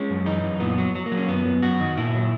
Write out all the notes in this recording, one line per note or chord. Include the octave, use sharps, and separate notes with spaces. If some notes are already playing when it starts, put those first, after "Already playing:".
Already playing: G#3 C#4
F#2
E3 D#4
F#2
A#2 B3
F#3
F#3
A#3
F#3
C#4
F#2 B3
F#2
F#2 F#4
D#3
A#2 E4
F#3